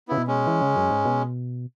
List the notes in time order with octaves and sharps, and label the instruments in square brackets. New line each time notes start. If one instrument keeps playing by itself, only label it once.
[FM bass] C#3 [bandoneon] B3 E4
[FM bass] B2
[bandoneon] G#3 C#4
[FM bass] E3
C#3
F#2
G#2
B2